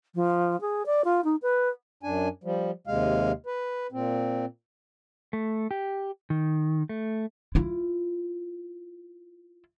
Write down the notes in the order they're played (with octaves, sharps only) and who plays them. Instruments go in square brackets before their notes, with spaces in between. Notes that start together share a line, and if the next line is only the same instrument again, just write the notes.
[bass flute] F3
G#4
D5
F4
D#4
B4
[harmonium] F#2 D4 G#5
F3 G3
D#2 C3 G#3 F5
B4
A#2 C4
[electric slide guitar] A3
G4
D#3
A3
[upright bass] E4 F4